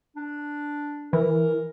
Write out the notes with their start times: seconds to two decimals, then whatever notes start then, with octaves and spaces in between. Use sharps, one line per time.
0.17 D4
1.13 E3 A#4